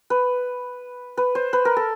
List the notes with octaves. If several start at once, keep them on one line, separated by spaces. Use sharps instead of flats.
B4
B4
C5
B4
A#4
A4